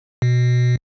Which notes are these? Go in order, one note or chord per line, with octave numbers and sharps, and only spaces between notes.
B2